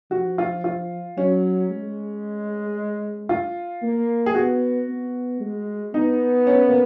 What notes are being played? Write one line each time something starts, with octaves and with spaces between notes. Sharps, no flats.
F3 F#4
F4
F4
F#3 C#4
G#3
F4
A#3
G#4
B3 F#4
B3
G#3
B3 D#4
C#4
A#3